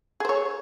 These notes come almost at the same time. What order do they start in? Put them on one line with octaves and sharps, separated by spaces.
G#4 C5 C#5